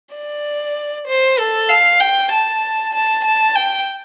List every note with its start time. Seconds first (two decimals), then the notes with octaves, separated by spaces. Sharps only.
0.15 D5
1.08 C5
1.39 A4
1.70 F5
2.00 G5
2.32 A5
2.93 A5
3.24 A5
3.55 G5